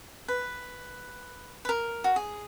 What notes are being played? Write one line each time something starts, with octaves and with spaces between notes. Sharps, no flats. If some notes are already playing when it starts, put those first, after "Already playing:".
B4
B4
A#4
F#4
G#4